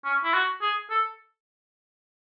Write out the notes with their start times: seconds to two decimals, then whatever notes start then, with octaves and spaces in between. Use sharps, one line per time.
0.05 C#4
0.24 E4
0.34 F#4
0.62 G#4
0.90 A4